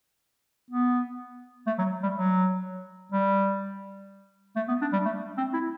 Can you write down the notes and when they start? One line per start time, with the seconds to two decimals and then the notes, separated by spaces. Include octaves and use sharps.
0.71 B3
1.67 A3
1.79 F#3
2.03 G3
2.16 F#3
3.12 G3
4.56 A3
4.68 B3
4.82 D4
4.93 G3
5.06 A3
5.38 C4
5.54 E4